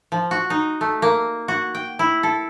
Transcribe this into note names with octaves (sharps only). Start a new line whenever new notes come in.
F3
F#4
D#4
A3
A#3
F#4
G5
E4
A4